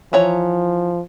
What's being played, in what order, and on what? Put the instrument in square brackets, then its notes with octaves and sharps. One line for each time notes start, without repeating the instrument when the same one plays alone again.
[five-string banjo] E3 C#5 A#5 [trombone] F3